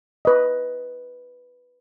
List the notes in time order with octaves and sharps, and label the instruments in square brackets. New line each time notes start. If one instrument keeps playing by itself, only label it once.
[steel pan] B4 D#5